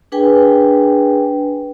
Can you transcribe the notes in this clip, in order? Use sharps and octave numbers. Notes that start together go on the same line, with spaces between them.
D4 G#4 B4 G5 G#5